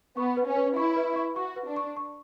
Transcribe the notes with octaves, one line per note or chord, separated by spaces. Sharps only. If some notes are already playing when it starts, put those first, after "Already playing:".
B3 C#6
B4
C#4
B4
E4 C#6
B4
C#6
F#4 C#6
B4
D4
C#6
C#6